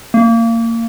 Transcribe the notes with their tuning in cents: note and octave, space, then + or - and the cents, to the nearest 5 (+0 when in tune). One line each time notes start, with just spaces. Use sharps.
A#3 -25